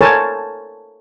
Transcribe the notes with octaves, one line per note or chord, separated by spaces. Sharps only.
A4 A#4 C5 C#5 G#5 A5